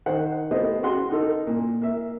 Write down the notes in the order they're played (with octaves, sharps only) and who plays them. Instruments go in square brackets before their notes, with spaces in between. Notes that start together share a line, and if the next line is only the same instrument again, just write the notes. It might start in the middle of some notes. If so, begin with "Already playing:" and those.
[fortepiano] D#3 C5 F#5
A3 B3 G4 C5 D#5
C#3 F#4 G#4 F#5 C6
D#4 A4 A#4
A#2
A#3 E5